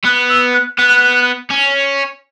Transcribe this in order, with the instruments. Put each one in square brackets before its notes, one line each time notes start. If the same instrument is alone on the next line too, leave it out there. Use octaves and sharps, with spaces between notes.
[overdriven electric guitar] B3 [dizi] F#6
[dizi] E6
F#6
[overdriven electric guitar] B3 [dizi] F#6
[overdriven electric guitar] C#4